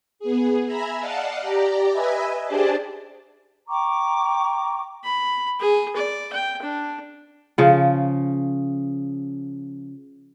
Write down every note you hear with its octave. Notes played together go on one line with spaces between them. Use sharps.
B3 G#4
E5 G#5 A#5 B5 E6
D5 D#5 F5 F#5 A5
G4 D5 A#5
B4 D#5 E5 G#5 B5
D4 G4 G#4 C5 D5 A5
G5 A#5 C#6 D6
B5
G#4
D5
G5
D4
C#3 F3